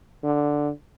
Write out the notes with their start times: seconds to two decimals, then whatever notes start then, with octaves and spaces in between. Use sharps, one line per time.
0.24 D3